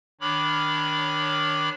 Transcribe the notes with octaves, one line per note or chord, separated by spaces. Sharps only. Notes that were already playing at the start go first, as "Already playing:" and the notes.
D#3 D4 C#5 B5 D6 F6